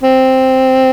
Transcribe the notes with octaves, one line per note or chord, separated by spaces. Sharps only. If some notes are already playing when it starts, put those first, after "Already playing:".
C4